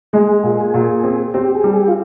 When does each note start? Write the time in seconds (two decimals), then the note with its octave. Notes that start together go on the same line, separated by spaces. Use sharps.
0.13 G#3 G#4
0.44 A#2
0.74 A#2
1.04 C4
1.34 C4 G4
1.55 G#4
1.64 G3
1.74 G#4
1.81 G4
1.88 F4